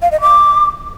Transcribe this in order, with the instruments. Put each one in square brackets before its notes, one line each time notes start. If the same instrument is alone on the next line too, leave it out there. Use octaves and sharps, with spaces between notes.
[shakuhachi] F5
D#5
D6